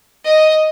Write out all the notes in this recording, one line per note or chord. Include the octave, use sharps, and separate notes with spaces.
D#5